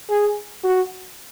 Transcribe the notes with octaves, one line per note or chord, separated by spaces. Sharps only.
G#4
F#4